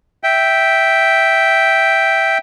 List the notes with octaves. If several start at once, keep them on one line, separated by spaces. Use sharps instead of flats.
E5 G5